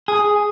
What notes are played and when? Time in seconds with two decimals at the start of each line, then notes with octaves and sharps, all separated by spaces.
0.08 G#4